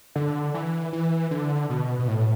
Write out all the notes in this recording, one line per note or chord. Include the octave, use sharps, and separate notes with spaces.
D3
E3
E3
D3
B2
B2
A2